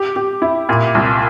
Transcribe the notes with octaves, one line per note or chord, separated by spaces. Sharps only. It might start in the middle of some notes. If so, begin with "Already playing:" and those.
Already playing: G4
G4
E4
A#2
C2